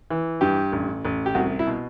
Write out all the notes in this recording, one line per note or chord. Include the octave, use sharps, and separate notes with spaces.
E3
G2 G4
A1
A1
G4
C2 F#4
E4
B2